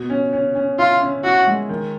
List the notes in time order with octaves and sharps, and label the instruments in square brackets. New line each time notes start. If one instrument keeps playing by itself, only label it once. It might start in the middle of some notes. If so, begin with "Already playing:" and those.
Already playing: [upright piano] B2
C#4
C#4
C#4
[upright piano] E4 [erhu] F4
[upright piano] C#4
[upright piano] E4 [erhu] F#4
[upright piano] G#3
D#3